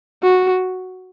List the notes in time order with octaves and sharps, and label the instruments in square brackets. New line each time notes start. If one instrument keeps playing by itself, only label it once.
[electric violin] F#4